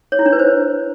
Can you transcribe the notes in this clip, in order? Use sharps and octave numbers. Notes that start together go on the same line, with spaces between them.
C#5
E4
D4
B4
C5